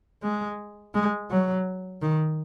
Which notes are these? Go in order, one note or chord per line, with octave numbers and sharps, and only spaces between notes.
G#3
G#3
F#3
D#3